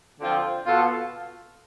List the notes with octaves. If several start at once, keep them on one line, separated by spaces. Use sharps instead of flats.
D3 F3 C4 F4
B2 B3 F4 A4